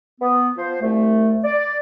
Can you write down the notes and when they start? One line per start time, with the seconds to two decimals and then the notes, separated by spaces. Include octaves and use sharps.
0.21 B3
0.56 F3 C5
0.82 C2 A3
1.44 D5